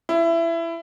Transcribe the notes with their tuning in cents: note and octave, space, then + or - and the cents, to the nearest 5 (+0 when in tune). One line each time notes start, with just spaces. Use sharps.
E4 +20